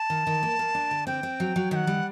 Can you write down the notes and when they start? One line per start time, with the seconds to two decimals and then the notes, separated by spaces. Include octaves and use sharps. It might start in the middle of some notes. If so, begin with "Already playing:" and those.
Already playing: A5
0.10 D#3
0.27 D#3
0.43 A#3
0.59 A#3
0.75 D4
0.91 D3
1.07 C4 G5
1.23 C4
1.40 F#3
1.56 F#3
1.71 D#3 G5
1.76 F#5
1.87 G3